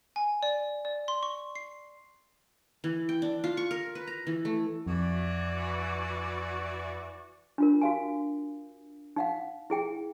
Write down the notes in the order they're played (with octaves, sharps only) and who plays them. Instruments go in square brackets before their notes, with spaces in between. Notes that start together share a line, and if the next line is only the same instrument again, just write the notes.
[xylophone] G#5
D5
D5
C6
C#6
C7
[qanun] E3
G5
D4
F4
C#6
A#4
B4
A#5
E3
A3
[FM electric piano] F2 [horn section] E3 F#4 D5
[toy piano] D4 F4 A#4
F#4 F5 G#5
D#4 F5 F#5
E4 G#4 G5